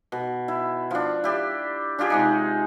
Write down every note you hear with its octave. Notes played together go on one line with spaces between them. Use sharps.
B2
E4
F3 D4
E4 G4 D5
D4 F4 G4 G#4
C3 G#3 D#4